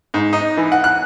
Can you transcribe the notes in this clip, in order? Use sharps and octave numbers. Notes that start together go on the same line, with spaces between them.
G#2
D#4
E3
F#5
F#6